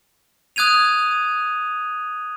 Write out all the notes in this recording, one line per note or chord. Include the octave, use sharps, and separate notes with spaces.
D#6 F#6 G#6 D#7 F7